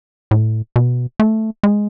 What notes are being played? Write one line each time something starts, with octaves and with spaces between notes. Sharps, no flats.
A2
B2
A3
G#3